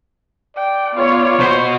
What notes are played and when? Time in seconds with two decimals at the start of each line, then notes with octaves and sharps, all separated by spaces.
0.56 D5 G5
0.94 B3 F4 C#5
1.40 B2 F#4 C5